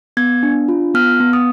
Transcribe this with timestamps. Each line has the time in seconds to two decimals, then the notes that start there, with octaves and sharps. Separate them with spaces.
0.17 B3 G#6
0.43 D4
0.68 F4
0.94 B3 F6
1.20 B3
1.33 D#6